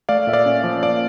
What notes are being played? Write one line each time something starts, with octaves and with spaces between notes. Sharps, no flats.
A3 D5 F5
A#2 E5
D5 F5
C#4
F3
A#3 D5 F5